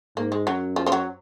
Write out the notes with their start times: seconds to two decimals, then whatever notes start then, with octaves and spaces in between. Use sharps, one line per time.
0.17 G#2 A#3
0.32 G#3
0.47 F#2 F#3
0.76 F3
0.86 F3
0.92 F#3